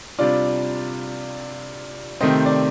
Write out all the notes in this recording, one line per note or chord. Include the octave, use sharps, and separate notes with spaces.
C3 G3 D4 F4 D5
C3 D#3 A3 C4 D#5
D5